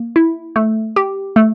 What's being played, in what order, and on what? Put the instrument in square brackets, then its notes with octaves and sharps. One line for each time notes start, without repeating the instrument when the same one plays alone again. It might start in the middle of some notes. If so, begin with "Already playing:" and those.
Already playing: [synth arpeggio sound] A#3
E4
A3
G4
A3